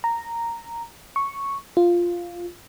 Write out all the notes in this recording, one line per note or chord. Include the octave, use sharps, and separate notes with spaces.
A#5
C#6
F4